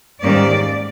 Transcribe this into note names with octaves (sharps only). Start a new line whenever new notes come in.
G#2 D#3 G3 A#3 C#4 D5